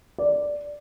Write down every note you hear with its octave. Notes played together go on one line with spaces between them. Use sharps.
D5